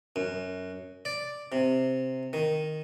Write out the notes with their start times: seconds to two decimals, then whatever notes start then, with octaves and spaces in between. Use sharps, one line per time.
0.16 F#2
1.05 D5
1.52 C3
2.33 D#3